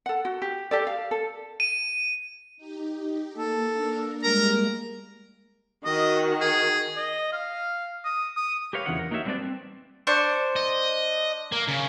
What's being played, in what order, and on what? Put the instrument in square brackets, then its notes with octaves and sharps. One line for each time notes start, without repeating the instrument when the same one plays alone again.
[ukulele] A4 F#5
F#4
G4
G4 A4 D5
F5
A4
[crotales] D#7
[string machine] D#4 G4
[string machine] A#3 [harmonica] A4
[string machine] A#3 D4 A#4
[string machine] G3 G#3 A#3 [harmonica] A#4 [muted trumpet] A#5
[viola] D#3 F#4 [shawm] D#5
[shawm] G#4
D#5
F5
D#6
D#6
[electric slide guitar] G4 A#4 B4 C#5 F5
E2 C#3 E3 D4 F4 F#5
A#4
A#3 D#4 F#4 G4 C#5 E5
F#3 G3 C4 D4 B4 D5
C4
[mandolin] D4 C5 C#6
[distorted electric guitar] D#5
A#3
C#3